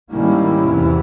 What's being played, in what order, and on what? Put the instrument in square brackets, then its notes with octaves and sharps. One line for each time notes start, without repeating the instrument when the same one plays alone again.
[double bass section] G#2 D#3 G3 A#3 C#4 [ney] E4
[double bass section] E2 C3 E3